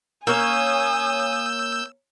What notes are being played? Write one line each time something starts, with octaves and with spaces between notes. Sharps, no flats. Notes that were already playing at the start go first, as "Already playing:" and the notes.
A#3 C#4 G#5 D#6 E6 G6